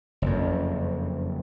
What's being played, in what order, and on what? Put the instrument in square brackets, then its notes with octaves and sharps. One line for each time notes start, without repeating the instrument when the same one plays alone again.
[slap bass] F#1 F2